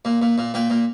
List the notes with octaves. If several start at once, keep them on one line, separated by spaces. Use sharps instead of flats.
A#2
A#2
A#2
A#2 G5
A#2